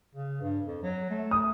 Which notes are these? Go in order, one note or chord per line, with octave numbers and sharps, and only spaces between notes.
C#3
G2
F2
F#3
A3
D#6